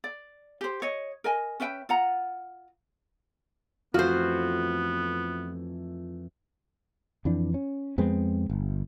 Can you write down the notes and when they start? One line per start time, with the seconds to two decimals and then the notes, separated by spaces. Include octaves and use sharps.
0.04 D5
0.61 G4 C5
0.82 C#5 D#5
1.24 A#4 D#5 G#5
1.60 C#4 B4 E5 G5
1.89 F4 F#5 A#5
3.94 F2 E3 A3 B3 F4 F#4 C5
7.25 F2 E3 D4
7.54 C#4
7.98 F2 G#3 B3 C4
8.50 G1